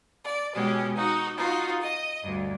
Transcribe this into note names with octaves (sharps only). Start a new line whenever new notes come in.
D5
B2 G#3 C#4 G4
D#4 F#4
D#4 F4 F#4
D#5
D2 G2